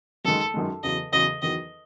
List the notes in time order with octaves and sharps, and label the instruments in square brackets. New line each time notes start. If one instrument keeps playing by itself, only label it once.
[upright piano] F#2 D#3 G#3 [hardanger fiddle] A4
[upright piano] F#2 D#3 G#3
[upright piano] E2 C#3 F#3 [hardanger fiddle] D#5
[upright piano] E2 C#3 F#3 [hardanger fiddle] D#5
[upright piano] E2 D#3 F#3 [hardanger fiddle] D#5